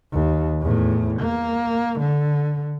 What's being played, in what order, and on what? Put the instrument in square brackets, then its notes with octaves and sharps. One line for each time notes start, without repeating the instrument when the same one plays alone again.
[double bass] D#2
E2 A2
A#3
D3